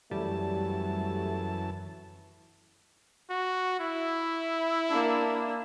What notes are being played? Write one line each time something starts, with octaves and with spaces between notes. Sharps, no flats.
F#2 E3 G3 A3 A5
F#4
E4
A#3 D4